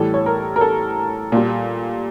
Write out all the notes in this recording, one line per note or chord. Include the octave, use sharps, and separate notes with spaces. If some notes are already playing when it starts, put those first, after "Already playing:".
Already playing: A2 E3 G3 A4
C#5
A#4
A#4
A4
A#2 G3